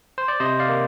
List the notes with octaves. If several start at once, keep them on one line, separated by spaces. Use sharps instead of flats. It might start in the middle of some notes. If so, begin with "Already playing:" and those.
C5
D5
C3 C5 D#5
D5 F5
A#3